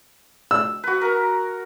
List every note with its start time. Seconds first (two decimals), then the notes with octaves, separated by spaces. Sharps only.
0.51 E6
0.84 F#4 B4
1.01 A#4